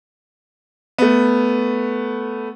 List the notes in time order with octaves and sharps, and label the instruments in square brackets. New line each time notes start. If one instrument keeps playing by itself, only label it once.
[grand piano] A3 B3